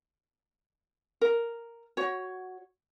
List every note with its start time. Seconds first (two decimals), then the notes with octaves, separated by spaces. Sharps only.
1.21 A#4
1.97 F#4 C#5